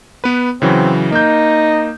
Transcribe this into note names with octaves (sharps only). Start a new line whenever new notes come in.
B3 B4
C#3 E3 F#3 C4
A#3 D#4 G6